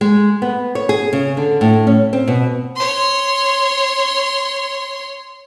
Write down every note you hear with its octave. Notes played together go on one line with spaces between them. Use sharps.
G#3
B3
C#5
G#4
C#3
D3
A2
C#4
C4
B2
C#5 C6